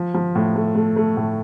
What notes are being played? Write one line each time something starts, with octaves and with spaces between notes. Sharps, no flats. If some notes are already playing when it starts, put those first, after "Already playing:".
Already playing: F3
F3
A2
A3
A3
A3
A2